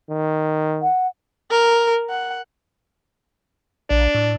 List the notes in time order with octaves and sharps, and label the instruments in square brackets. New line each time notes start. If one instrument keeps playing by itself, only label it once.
[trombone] D#3
[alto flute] F#5
[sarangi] A#4
F#5
[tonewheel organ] A#1 [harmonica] D4
[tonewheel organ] A2